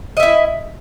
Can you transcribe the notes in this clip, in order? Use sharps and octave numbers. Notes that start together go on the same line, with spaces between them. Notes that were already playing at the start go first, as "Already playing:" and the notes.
E4 D#5 E5